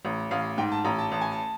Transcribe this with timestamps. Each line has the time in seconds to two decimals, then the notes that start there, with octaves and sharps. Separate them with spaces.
0.05 A1
0.31 A1 F5
0.58 G#2 G5
0.72 A5
0.85 A1 A#5
0.98 A5
1.11 A1 A5
1.21 G#5
1.31 A5